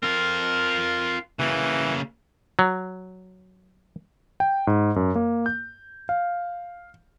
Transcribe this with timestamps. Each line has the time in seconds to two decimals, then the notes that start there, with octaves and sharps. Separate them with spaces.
0.03 C4 F4 A#4
1.39 C#3 E3 A#3
2.59 F#3
4.40 G5
4.67 G#2
4.96 F#2
5.15 A#3
5.46 G6
6.09 F5